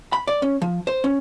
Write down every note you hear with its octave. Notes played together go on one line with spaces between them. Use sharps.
B5
D5
C#4
F3
C5
C#4